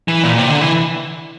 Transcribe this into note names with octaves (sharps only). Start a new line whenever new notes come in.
E3
A#2
C3
D3
E3